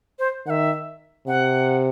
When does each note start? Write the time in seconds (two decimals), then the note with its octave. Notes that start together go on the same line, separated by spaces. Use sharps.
0.19 C5
0.46 D#3 F#5
0.50 E5
1.27 C3 F#5